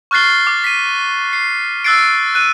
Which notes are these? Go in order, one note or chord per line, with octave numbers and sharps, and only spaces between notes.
C#6 F6 F#6 A6 C7 G7
D6
B6 D#7
C7
E6 F#6 A6 C7 D7
F#6 D#7